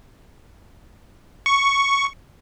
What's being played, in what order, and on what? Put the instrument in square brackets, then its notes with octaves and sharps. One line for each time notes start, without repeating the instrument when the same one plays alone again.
[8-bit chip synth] C#6